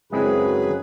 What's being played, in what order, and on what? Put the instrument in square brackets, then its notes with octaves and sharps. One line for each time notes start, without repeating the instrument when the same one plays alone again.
[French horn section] F#2 C#3 [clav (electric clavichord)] G#3 C4 E4 [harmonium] G#4 B4